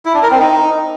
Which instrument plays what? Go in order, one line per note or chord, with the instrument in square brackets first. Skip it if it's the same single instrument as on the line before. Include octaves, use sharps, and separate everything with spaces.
[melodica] E4
D4
A#4
C4
D#4